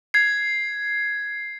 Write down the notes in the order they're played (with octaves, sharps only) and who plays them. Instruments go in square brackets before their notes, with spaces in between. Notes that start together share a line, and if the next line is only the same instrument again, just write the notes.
[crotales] G#6 C7